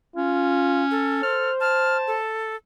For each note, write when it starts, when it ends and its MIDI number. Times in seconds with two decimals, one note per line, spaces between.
0.16 1.21 61
0.16 0.85 65
0.91 1.50 69
1.23 2.19 72
1.23 1.52 89
1.61 2.36 81
1.61 1.98 89
2.07 2.56 69